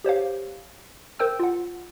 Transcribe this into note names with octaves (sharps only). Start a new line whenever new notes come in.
G4 C5 C#5 F5
A#4 C5 G5 E6
F4 F#5